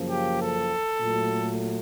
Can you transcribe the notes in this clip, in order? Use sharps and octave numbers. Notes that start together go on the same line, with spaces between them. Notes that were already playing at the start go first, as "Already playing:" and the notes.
Already playing: F#2 C#3 F3 A#3
G4
A4
A#2 F#3 A3